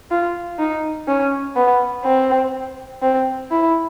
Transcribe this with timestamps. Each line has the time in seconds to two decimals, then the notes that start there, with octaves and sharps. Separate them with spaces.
0.11 F4
0.59 D#4
1.08 C#4
1.56 B3
2.05 C4
3.02 C4
3.51 E4